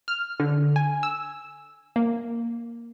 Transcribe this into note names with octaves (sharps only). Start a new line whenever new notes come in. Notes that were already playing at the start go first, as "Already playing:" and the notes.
F6
D3
G#5
E6
A#3